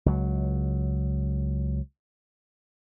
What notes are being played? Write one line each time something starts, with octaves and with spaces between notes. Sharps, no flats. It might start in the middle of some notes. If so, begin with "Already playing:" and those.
C#2 F#3